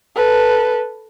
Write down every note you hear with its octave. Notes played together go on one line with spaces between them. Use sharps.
A4 B4